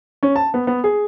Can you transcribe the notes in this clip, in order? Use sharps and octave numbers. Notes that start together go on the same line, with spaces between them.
C#4
A5
B3
B3
G#4